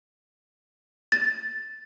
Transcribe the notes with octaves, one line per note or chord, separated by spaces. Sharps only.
A6